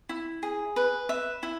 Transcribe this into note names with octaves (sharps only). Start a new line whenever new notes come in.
E4
G#4
B4
E5
E4